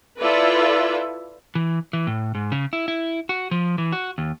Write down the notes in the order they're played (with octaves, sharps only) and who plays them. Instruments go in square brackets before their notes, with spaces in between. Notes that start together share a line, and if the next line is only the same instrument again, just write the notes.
[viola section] E4 F4 A4 B4 D5 E5
[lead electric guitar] E3
E3
A2
G#2
C#3
E4
E4
F#4
F3
E3
F#4
D#2